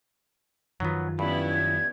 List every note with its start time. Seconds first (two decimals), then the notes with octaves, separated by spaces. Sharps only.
0.80 F#2 D#3 F3 F#3 B3
1.19 G2 B3 C#4 E4 B5
1.50 G#6